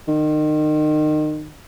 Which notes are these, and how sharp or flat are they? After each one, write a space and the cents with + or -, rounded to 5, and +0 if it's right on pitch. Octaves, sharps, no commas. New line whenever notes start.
D#3 -30